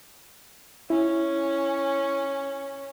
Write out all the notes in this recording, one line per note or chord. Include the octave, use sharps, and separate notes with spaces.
C#4 E4